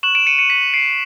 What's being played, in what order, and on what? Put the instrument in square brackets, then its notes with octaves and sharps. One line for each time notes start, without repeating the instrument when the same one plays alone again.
[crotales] C#6 F#6 E7 F#7
D7 E7
C#7 D#7
C#7 D#7
B6 C#7
C7 D7